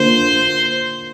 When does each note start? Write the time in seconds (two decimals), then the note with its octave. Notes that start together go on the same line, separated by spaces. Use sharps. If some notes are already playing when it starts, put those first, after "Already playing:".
Already playing: D3 A#3 F4 C5